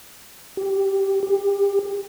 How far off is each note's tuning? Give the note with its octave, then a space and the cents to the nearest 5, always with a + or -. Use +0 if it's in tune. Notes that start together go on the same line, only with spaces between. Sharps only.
G4 -10
G4 +30